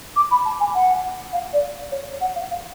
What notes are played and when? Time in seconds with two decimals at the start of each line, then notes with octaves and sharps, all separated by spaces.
0.16 D6
0.30 B5
0.44 A5
0.59 G#5
0.74 F#5
1.32 F5
1.53 D5
1.91 C#5
2.20 F#5
2.35 F5
2.50 F5